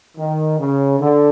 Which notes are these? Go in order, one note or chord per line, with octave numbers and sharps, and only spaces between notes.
D#3
C#3
D3